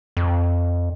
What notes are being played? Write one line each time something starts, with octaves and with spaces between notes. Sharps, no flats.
F2